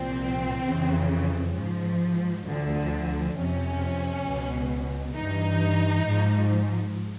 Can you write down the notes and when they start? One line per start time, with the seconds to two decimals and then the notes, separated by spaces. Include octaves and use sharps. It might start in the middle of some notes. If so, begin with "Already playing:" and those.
Already playing: C2 A#2 F3 C4
0.66 F2 C#3 E3
1.55 G#2 F3
2.46 D2 D3 F3
3.35 F2 C3 F3 C#4
4.25 C#2 B2
5.15 G2 E3 D#4
6.06 G#2 F3